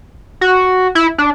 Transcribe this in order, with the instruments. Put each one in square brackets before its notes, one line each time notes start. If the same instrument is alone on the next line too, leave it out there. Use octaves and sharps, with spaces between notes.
[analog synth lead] F#4
E4
D4